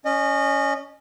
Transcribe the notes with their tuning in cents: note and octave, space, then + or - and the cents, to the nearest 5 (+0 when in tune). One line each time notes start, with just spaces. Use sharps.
C#4 +10 D#5 -30